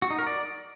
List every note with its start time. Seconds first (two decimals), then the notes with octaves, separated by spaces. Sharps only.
0.02 F#4
0.10 D#4
0.19 A#4
0.27 D5